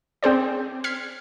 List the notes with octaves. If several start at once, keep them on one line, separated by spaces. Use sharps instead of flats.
C4 G#4 C5 D5
F6 G#6 B6 C7